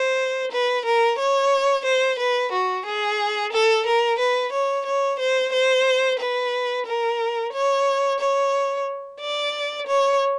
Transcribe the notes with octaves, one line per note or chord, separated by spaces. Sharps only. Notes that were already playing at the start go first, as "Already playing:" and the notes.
Already playing: C5
B4
A#4
C#5
C5
B4
F#4
G#4
A4
A#4
B4
C#5
C#5
C5
C5
B4
A#4
C#5
C#5
D5
C#5